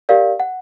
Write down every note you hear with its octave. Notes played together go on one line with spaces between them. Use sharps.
G4 A#4 D5 F5
F#5